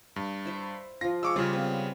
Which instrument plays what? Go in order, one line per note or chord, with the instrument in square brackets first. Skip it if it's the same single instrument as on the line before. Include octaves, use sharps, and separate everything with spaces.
[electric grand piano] G2
[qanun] E4 C5 E5
[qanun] F3 F4 [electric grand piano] A#6
[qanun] G#3 [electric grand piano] C#6 D6 E6
[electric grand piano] C#3 G3 [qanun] C#4 F4 D5
[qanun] B3 C4